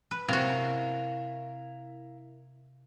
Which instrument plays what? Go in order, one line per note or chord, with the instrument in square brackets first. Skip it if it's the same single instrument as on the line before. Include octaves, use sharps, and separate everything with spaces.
[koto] B4
[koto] C3 F#4 [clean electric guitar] E4 A#4 F5